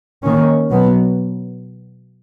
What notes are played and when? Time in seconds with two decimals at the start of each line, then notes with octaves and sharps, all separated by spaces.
0.24 D#3 A#3 C#4
0.70 B2 F#3 B3